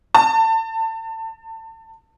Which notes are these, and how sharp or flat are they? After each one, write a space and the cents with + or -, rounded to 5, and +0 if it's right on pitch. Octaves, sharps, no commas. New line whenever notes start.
A5 +30